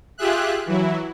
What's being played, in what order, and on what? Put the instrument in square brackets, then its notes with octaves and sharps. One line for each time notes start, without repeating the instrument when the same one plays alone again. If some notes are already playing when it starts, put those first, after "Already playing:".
[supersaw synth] F4 G4 G#4 E5 F#6
E3 F#3 E4